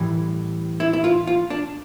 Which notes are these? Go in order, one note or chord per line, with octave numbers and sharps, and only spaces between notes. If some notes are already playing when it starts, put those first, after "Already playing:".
Already playing: A2 E3 G3
E4
E4
F4
F4
D4